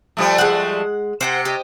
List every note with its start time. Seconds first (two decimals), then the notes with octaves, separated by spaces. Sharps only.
0.17 F3 G3 A3
0.38 G#3 F#5
1.21 C3 C5 F#5 G5
1.45 G4 D#5